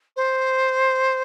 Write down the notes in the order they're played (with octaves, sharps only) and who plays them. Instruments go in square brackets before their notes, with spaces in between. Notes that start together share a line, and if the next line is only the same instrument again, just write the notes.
[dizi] C5